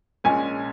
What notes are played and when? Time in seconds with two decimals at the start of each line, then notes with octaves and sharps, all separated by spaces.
0.24 A#1 A#2 G#3 C#4 G#5